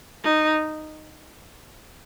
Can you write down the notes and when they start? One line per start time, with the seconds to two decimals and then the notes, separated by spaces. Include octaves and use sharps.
0.24 D#4